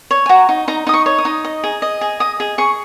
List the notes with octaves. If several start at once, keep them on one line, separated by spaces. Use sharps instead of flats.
C#5
G#5
F#4 A#5
D#4
D#4 A#5
D#4 D#6
C#6
C#5
D#6
D#4
D#5
G#4
D#5
G#4
D#5 D#6
G#4
G#4 C#6